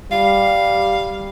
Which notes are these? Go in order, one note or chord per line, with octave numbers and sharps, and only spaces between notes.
G3 F5